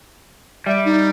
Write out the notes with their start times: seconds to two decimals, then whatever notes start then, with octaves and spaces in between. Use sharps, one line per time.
0.66 G3 E5
0.85 D#4